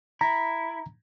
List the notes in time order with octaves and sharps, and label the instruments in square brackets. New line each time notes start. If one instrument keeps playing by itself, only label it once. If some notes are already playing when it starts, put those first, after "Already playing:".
[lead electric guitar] E4 [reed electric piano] A#5